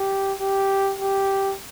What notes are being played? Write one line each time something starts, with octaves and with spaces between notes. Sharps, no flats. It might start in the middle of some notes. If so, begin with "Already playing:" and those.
Already playing: G4
G4
G4